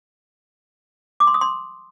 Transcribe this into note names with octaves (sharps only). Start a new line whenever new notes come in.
D6
C6
D#6
C6